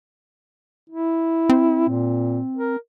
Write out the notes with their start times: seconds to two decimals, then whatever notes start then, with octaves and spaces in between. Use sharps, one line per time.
0.90 E4
1.49 C4
1.89 A#2
2.56 A#4